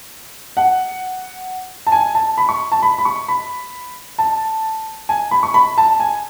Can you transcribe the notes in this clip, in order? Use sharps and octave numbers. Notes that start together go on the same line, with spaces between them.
F#5
A5
G#5
A5
B5
C#6
A5
B5
B5
C#6
B5
A5
G#5
B5
C#6
B5
A5
G#5